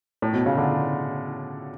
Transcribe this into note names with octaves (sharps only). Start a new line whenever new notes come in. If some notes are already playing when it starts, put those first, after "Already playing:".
A2
B2
C#3
D3